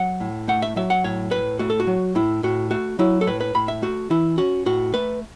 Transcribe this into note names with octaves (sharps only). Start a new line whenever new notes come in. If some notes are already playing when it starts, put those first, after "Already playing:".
Already playing: F#3 F#5
A2
A3 F#5
E5
F#3 E5
F#5
A2 C#5
A2 B4
A3 F#4
A4
F#4
F#3
A2 E4
A2 F#4
A3 F#4
F#3 E4
A4
A2 B4
B4
A2 B5
E5
A3 F#4
E3 E4
C#4 F#4
A2 F#4
A3 B4